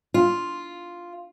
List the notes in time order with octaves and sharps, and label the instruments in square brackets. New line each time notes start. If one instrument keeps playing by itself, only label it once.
[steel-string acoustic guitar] F4